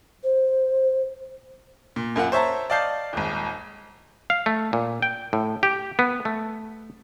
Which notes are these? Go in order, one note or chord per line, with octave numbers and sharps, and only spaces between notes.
C5
A#2
F#2 A#3 F4 F#5
C5 C#5 E5 A5 A#5
D5 D#5 F5 A5 G6 C7
D#1 G#1
F5
A3
A#2
G5
A2
G4
B3
A3